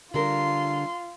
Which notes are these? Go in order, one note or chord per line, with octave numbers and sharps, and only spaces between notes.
D3 G3 F4 A#4 C6